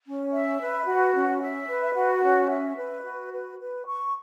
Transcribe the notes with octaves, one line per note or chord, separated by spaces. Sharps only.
C#4
E5
B4
F#4
C#4
E5
B4
F#4
C#4
E5
B4
F#4
B4
B4
C#6